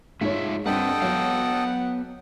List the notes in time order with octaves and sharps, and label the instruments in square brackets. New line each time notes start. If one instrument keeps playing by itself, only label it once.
[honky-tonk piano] G#2 C#5 [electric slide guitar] A3 F4 E5
[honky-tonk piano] G2 [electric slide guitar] C4 B4 [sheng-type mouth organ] A4 D#5 G5 [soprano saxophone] F#5
[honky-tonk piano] F#3 [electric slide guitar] B3 F5